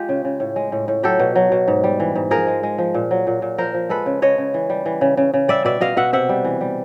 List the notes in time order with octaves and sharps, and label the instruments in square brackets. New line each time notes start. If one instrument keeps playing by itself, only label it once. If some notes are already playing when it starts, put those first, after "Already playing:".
Already playing: [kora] G#3 F4 G4
C#3
C#3
A2
G#3
A2
A2
F#3 G4 A4
B2
F#3
B2
G#2
G3
E3
G#2
F3 G#4 A#4
G#3
G#3
F3
A#2
F#3
A#2
A#2
F3 A#4 C5
F3
G#3 A4 B4
C#3
C#3 C#5 D#5
C#3
E3
G3
E3
C#3
C#3
C#3
G3 D5 E5
B2 D5 E5
B2 D#5 F5
B2 E5 F#5
C3 E5 F#5
G3
E3
G3